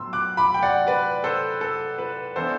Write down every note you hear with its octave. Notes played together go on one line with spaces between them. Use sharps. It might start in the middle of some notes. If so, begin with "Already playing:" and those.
Already playing: A2 F#3 B3 C6 E6
D6 F#6
B5 D6
G5
D5 F#5
B4 D5
A4 C5
A4
B4
E3 B3 D4 A4 C5